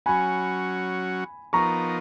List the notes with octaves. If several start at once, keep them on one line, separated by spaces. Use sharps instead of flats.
F#3 C#4 F#4 G#5 B5
F3 B3 D#4 A#4 A#5 C#6